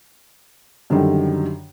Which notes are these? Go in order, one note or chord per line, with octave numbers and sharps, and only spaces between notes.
F#2 D3 D#3 G3